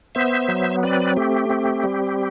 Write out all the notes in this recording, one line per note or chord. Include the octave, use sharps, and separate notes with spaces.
B3 C5 E5
F#3
C4 B4 D5
A3 G4
C4
G3